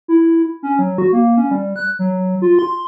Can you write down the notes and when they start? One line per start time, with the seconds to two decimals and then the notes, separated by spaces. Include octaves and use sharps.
0.08 E4
0.63 C#4
0.79 F#3
0.98 F#4
1.13 A#3
1.37 C#4
1.51 G3
1.76 F#6
1.99 F#3
2.42 F4
2.59 C6